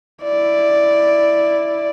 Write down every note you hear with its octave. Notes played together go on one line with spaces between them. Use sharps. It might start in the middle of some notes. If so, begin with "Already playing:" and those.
E4 D5